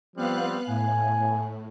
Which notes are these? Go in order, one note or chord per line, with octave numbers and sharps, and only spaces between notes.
F3 G3 B3 C4 F5 F#6
A2 G#5